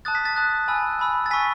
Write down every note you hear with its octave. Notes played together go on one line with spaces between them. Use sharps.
A5 D#6 F#6 A6
B6
A6
A5 D#6 F#6
G#5 B5 E6
G#5 B5 E6
A6
G#5 C#6 E6 B6